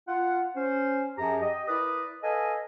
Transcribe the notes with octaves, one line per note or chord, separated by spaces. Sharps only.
F4 F#5
C#4 C5
F#2 F3 G4 G#4 A#5
G4 D#5
E4 A#4 B4 D5 D#6
A4 B4 D#5 F5 G#5